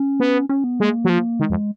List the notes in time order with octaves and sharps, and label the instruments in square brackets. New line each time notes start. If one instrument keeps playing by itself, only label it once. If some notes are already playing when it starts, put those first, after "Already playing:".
Already playing: [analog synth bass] C#4
[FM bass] B3
[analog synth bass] C#4
B3
[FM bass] G#3 [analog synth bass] A#3
[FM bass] F#3
F3
[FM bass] D#3 [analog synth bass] G#3
[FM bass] F2